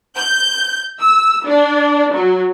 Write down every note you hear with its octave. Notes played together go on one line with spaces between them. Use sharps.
G6
E6
D4
F#3